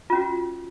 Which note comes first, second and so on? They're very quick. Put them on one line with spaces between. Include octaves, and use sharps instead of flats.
F4 C#4 F#4